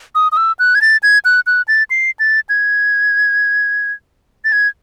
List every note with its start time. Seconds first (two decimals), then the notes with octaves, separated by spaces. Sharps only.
0.15 D#6
0.32 D#6
0.37 E6
0.59 F#6
0.75 G#6
0.82 A6
1.03 G#6
1.25 F#6
1.47 F#6
1.68 A6
1.90 C7
2.20 A6
2.49 G#6
4.45 A6
4.52 G#6